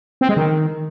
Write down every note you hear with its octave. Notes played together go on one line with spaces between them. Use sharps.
C4
G#3
D#3